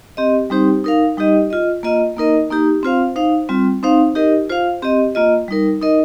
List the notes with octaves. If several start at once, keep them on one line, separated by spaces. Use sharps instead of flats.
C4 G4 D#5
G3 C4 D#4 G4 C5
D#4 A#4 F5
G3 D#4 G4 D#5
F4 D#5
A#3 F4 D#5
A#3 D#4 A#4 D#5
A#3 D#4 G4
C4 F4 C5 F5
D#4 C5 F5
G3 C4 F4
C4 D#4 C5 F5
D#4 G4 A#4 D#5
F4 C5 F5
C4 G4 D#5
A#3 F4 D#5
G3 D#4 A#4
D#4 A#4 D#5